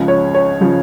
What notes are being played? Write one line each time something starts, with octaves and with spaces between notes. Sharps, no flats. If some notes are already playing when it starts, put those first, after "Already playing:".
Already playing: C#2 C#3 F3
C#5
C#5
C#3 F3